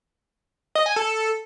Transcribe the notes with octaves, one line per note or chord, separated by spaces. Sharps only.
D#5
G#5
A4